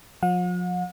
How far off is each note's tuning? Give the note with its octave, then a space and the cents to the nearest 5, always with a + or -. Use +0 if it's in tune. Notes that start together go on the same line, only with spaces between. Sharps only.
F3 +40 F#5 -45